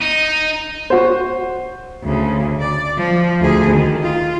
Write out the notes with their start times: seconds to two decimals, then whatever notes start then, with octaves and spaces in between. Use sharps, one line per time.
0.02 D#4
0.90 F#4 C5
2.04 D2 C#3
2.60 D5
2.97 F3
3.41 D2 G#4
3.72 D#3
4.03 F4